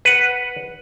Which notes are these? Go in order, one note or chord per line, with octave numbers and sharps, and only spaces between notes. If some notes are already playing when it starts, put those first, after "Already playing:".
B4 F#5